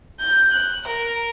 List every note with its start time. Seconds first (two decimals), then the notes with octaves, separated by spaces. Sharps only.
0.19 G6
0.52 F#6
0.86 A#4